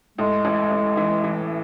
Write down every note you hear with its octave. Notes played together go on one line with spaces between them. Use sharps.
A2 G#3
A1
A1
E3
E3